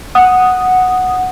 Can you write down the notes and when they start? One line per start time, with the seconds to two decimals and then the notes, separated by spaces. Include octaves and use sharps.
0.15 F#5 D#6